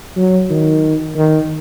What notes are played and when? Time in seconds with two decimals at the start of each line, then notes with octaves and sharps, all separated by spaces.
0.16 F#3
0.50 D#3
1.16 D#3